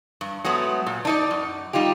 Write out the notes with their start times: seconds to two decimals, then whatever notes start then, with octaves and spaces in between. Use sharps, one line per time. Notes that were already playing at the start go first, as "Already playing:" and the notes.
0.21 G2
0.44 F#3 G#3 A3 B3
0.86 A#2
1.05 D4 D#4 D5
1.31 F#2
1.73 G3 D#4 F4 G4